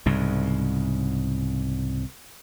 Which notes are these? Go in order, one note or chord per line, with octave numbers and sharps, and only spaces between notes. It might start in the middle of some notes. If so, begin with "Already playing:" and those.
C2 G#2 C#3